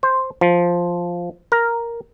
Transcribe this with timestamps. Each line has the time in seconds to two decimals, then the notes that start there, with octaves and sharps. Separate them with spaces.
0.03 C5
0.41 F3
1.52 A#4